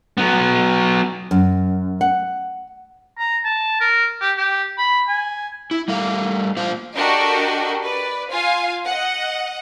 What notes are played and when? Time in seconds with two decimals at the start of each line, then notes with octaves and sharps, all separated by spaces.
0.18 F#3 B3
1.31 F#2
2.01 F#5
3.19 A#5
3.45 A5
3.80 A#4
4.21 G4
4.37 G4
4.78 B5
5.08 G#5
5.71 E4
5.88 G3 A3 A#4 F5
6.57 A#3 F4 C5 F5
6.96 D4 F#4 G4 A4 A#4 D#5
7.83 B4 D5
8.30 F4 F5 G#5
8.86 D#5 F#5